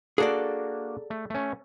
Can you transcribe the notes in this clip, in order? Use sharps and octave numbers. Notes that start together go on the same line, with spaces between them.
A#3 D4 F#4 G#4 A4 D5
A3
A3 C#4